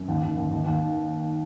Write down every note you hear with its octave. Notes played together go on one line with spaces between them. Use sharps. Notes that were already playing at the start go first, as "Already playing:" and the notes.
Already playing: F#2
D#2
D#2
D#2
D#2
D#2